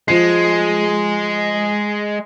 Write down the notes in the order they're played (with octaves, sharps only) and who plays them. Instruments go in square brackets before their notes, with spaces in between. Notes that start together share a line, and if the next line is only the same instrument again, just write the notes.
[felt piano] F3 C7 [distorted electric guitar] G#3